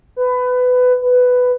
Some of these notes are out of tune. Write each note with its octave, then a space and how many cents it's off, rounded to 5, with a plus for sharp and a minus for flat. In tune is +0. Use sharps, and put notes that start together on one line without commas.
B4 +20
B4 +10